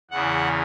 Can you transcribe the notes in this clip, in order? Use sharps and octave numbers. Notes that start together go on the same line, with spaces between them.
E2 C#3 E3 F#5